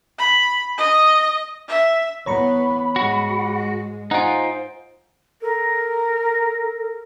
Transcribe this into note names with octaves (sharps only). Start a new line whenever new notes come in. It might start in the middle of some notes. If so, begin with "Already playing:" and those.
B5
D#5
E5
E3 B3 C#5 A#5 B5 C#6
G#2 G#3 F#4
D#4 F4 C5 F#5 G#5 D7
A4 A#4